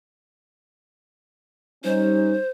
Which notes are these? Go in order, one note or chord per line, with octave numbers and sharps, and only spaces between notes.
G3 C#4 D#4 C5